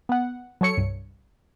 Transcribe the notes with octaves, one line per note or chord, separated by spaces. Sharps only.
B3 F#5
F#3 A4 C#5 C#7
C2 G2